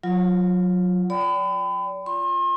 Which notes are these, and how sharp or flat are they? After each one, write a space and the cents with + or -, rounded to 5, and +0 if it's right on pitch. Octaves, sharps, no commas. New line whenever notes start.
F#3 -25 F4 +0
D5 -35 G5 +0 B5 +35
F4 +0 C6 +40